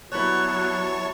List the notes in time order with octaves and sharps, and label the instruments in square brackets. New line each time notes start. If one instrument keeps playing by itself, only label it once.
[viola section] F#3 B3 [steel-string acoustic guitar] G3 E4 [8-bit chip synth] C#5 A5 C#6 [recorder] F#6